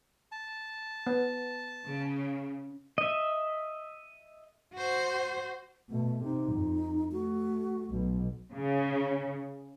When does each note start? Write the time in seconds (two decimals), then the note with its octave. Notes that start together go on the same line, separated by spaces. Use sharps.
0.32 A5
1.07 B3
1.86 C#3
2.98 D#5 E5
4.74 F#4 C5
5.90 B2 A3
6.24 C3 D#4
6.53 F2
7.12 A3 F#4
7.90 B1 B2
8.54 C#3